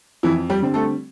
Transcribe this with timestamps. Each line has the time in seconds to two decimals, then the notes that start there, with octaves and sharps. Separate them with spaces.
0.23 F2 E3 E4
0.50 G3 G4
0.62 D3 G3 C4
0.74 A3 A4